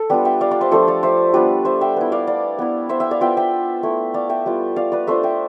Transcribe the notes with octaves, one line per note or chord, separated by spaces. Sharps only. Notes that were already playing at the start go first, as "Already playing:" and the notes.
Already playing: A4
G3 B3 D4 F4 G4 B4
E5 G5
D5 F5
D5 F5
C5 E5
F3 A3 D4 F4 A4 C5
D5 F5
C5 E5
G3 B3 D4 F4 B4 D5
C5 E5
E5 G5
B3 E4
D5 F5
D5 F5
B3 E4
C5 E5
E5 G5
D5 F5
B3 F4 E5 G5
E5 G5
A3 E4
D5 F5
E5 G5
G3 B3 F4
D5 F5
B4 D5
A3 D4 F4 C5 E5
E5 G5